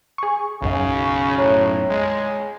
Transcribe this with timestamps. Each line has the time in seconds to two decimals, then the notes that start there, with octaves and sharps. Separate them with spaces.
0.18 G#4 C#6
0.62 B1 F#2 C#3
1.03 C#6
1.38 A2 C#5 A#5 F#6
1.89 G#3